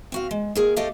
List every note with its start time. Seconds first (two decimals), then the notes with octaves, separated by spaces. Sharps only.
0.12 C4 F#4 F5
0.31 G#3
0.55 D#2 G#4 A#4
0.76 A3 D4 G4 A4 D#5 F5